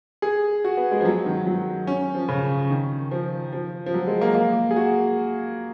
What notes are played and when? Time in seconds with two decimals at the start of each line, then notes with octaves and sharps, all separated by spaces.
0.22 G#4
0.64 F#4
0.77 B3
0.91 G#3
1.00 F3
1.05 F#3
1.26 D#3
1.47 F#3
1.87 C#4
2.15 F3
2.29 C#3
2.70 D#3
3.11 F3
3.53 F3
3.86 F3
3.94 F#3
4.07 G#3
4.21 A#3
4.35 A#3
4.71 G#4
4.76 F#4